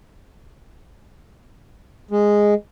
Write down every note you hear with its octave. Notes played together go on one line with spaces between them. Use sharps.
G#3